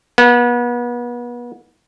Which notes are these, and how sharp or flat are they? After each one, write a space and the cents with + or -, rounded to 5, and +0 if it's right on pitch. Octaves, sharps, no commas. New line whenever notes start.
B3 -35